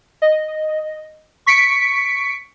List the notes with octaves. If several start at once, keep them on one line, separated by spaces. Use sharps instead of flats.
D#5
C#6 B6 C#7 D7